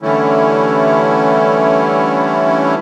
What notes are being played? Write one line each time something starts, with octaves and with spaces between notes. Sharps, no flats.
D3 E3 G3 A3 C#4 E4